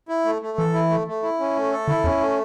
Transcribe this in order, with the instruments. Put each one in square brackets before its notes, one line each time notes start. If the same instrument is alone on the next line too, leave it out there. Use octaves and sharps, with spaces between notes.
[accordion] E4
A3
A3
[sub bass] E3 [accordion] A4
[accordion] E4
A3
A3
E4
C#4
A3
A4
[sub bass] D3 [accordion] E4
[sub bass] E2 [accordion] C#4
[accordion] A3